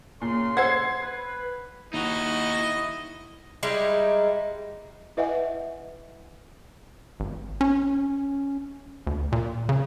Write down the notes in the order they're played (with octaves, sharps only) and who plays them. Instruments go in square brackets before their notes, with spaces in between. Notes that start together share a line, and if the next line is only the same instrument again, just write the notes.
[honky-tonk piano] A#2 [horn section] C#3 C6
[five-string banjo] A4 C5 F#5 [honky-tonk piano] G#6 C7
[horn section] B4
[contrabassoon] D#2 [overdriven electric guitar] D#4 F#4 [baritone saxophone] E4 [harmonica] D#5
[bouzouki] G3 G#3 D#4 E4
[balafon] E4 B4 D#5 E5 F#5 G#5
[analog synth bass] G#1
C#4
D2
A#2
C#3